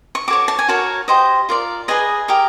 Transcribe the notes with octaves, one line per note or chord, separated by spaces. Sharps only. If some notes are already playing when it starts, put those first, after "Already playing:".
C#6
F#4 A4 C#5 D6
A5
G#5
F#4 A#4 C#5 A5
G4 C5 D#5
F4 A#4 D5
G#4 B4 D#5 G#5
G4 A#4 D#5